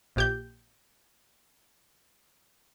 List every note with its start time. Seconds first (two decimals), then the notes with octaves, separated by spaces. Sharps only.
0.16 A#1 G4 G6